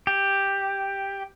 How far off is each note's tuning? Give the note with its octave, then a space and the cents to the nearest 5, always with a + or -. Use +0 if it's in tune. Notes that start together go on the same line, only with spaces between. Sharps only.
G4 +5